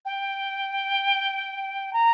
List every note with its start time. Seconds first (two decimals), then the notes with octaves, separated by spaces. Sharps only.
0.05 G5
1.93 A#5